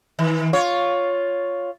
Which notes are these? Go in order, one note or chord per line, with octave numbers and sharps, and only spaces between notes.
D#3
F4 C#5